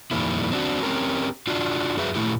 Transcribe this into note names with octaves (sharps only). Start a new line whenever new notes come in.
F2 A#2 D#3 G3 A#3 E4
C4 D4 F#4
C4 C#4 G4 A#4
D4 F4 F#4
F#2 F#4 G#4 B4 E5
A#2 A3 E4 G4